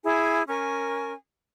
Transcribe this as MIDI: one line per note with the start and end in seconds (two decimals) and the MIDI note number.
0.04 0.42 64
0.04 0.42 68
0.04 0.42 80
0.48 1.12 61
0.48 1.12 70
0.48 1.12 80
0.48 1.12 85